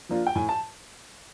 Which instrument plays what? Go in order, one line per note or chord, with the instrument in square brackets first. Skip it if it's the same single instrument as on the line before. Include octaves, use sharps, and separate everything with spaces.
[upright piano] F3 A#3 D4 F4
G5
A2 G#5
A5